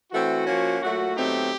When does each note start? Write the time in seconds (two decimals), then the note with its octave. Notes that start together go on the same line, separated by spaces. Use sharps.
0.12 E3 A3 C4 F#4
0.46 F3 A#3 C#4
0.81 A#2 F#3 A3 F#4
1.16 B2 F#3 A3 C4 D#4 G4